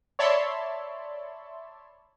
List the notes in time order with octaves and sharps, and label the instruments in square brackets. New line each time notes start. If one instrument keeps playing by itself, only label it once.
[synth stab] C#5 D5 E5 A5 B5 C6